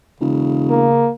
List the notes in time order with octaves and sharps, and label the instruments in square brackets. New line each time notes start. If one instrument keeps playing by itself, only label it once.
[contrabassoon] E1 [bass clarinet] C#3
[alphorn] A#3